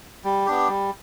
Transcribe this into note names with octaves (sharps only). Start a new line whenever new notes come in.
G3
B3 D4 G4
G3